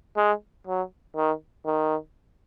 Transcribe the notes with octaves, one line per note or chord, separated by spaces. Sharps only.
G#3
F#3
D#3
D#3